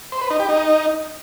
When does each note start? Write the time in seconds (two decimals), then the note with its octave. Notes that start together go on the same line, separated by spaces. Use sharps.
0.12 C5
0.21 B4
0.30 D#4
0.40 G4
0.49 D#4